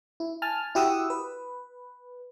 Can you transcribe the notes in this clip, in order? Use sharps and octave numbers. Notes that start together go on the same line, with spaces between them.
E4
G#5 A5 F6
E4 F#4 G4 F#5 D#6 E6
B4